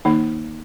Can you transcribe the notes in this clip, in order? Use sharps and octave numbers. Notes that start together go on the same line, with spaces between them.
D#3 A#3 D#4